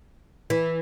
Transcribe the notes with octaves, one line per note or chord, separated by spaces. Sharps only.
E3